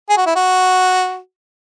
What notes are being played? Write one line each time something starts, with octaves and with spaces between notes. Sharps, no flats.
G#4
F#4
E4
F#4